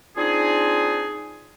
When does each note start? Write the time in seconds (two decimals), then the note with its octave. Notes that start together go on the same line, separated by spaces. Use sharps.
0.17 C4 D4 D#4 F4 G#4